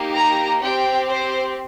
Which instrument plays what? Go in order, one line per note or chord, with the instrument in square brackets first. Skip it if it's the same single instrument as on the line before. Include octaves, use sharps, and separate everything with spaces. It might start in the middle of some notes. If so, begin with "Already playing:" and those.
Already playing: [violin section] A#3 D#4 G4
A#5
C4 G4 G5
C5